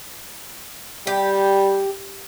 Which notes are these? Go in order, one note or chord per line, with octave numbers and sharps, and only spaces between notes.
G3 G4